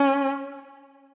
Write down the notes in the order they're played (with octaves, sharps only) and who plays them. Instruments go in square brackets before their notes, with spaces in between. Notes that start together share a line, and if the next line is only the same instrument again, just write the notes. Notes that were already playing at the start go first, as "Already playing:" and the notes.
Already playing: [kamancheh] C#4